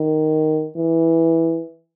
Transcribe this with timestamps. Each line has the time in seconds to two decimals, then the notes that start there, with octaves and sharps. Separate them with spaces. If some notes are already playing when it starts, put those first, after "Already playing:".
Already playing: D#3
0.76 E3